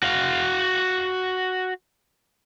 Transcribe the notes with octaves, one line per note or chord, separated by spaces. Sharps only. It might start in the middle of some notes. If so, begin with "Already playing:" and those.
F#4 F5